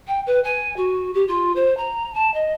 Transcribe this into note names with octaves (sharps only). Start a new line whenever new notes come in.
G5
B4
G#5
F#4
G4
F4
C5
A#5
A5
D#5